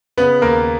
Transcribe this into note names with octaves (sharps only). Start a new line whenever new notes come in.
C#3 B3 B4
D#2 A#3 A#4